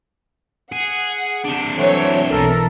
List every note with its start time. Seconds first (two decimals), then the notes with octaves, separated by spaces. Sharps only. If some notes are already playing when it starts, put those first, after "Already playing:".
0.72 G#4 F#5
1.44 C3 D4
1.76 E3 F#3 A3 C5 C#5
2.31 B1 E3 A4 A#4